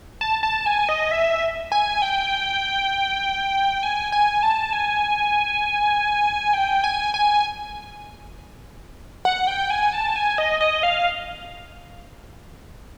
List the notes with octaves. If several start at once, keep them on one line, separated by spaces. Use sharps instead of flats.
A5
A5
G#5
D#5
E5
G#5
G5
G#5
G#5
A5
G#5
G5
G#5
G#5
F#5
G5
G#5
A5
G#5
D#5
D#5
F5